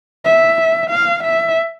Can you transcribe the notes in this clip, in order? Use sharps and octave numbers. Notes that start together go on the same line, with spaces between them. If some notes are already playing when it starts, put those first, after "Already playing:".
E5
F5
E5